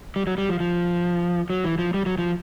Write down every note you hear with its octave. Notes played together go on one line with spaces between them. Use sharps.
G3
F#3
G3
F3
F3
F#3
E3
F3
G3
F#3
F3